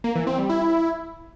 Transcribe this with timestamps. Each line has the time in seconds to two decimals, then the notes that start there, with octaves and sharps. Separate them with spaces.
0.04 A#3
0.15 E3
0.27 C4
0.38 G3
0.49 E4